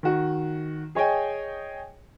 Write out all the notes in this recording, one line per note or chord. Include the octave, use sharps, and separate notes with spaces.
D#3 F#4
G#4 C#5 D#5 G5 G#5